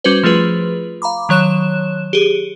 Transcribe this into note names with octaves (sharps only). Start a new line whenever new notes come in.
G3 C#4 F#4 B4 C5
F3 A3 F4 G#4 B4
F5 A#5 B5 D6
D#3 F#3 C#5 F#6 E7
G4 G#4